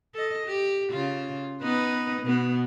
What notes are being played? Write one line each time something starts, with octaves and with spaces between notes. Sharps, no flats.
A4 D#5
G4
C#3 F4
B3 D#4 B4
B2 B3